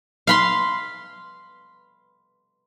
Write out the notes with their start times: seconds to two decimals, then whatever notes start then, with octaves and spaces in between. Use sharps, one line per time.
0.27 F5 B5 C6